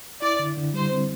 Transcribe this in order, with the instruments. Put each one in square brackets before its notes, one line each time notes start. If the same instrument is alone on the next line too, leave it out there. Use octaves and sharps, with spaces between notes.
[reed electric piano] E4 [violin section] D5
[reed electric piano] D3
D3
[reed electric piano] G3 [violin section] C5
[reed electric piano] C4